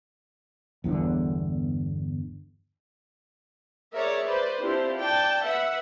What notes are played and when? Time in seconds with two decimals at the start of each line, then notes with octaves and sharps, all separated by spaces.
0.84 G1 E2 G2 D3
3.95 G#4 A#4 C#5 D5 E5
4.26 B4 C5 D5
4.61 C4 D4 E4 F4 G4 C5
4.98 D5 G5 A5
5.46 B4 E5 F#5